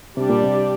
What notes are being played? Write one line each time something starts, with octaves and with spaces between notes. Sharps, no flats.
C3 G3 D4 G4 D5
A#2
C3